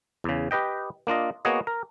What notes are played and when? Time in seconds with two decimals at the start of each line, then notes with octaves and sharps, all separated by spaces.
0.24 E2 C#3
0.51 G4 B4 D#5 G5
1.07 A#3 D4 F4 D#5
1.45 A#3 B3 F#4 G#4 C#5 D#5
1.67 A#4